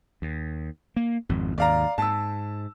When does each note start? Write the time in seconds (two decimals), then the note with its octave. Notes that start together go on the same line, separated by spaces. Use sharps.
0.22 D#2
0.96 A#3
1.29 G#1 F2
1.58 D#2 G#2 D5 F5 A#5
1.98 G#2 A5 E6